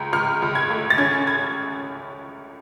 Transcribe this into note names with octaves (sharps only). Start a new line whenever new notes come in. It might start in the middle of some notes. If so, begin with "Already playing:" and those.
Already playing: C#2
C#2 F6
C#2
G#6
A3
A6
C#4 G#6
G#6